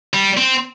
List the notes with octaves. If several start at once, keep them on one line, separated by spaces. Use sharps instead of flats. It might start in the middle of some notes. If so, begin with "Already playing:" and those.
G3
C4